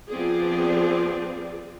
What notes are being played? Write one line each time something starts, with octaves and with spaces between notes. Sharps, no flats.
F3 B3 C4 G#4 D5